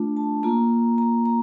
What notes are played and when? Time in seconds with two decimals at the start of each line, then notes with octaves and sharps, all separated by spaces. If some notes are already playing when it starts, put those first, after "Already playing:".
Already playing: A3 D4 F4
0.17 A5
0.43 A#3 F4 A#5
0.98 A#5
1.25 A#5